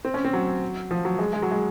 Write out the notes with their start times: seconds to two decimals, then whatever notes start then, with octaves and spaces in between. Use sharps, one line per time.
0.05 C4
0.14 C#4
0.25 C4
0.33 F#3
0.91 F3
1.05 F#3
1.19 G#3
1.33 G#3
1.42 F#3
1.51 G#3